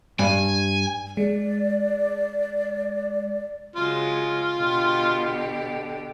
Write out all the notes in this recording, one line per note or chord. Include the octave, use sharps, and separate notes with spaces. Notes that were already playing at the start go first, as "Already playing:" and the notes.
G2 G#5
G#3 D5
C#3 F#3 G#3 F4
B2 D3 G4